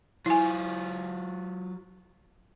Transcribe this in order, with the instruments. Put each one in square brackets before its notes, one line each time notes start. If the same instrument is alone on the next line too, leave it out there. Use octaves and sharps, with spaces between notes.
[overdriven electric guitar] F#3 F4 [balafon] E4 G#5